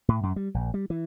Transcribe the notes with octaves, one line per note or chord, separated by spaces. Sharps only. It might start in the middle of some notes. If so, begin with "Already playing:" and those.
A2
F#2
G3
A#1
G3
E3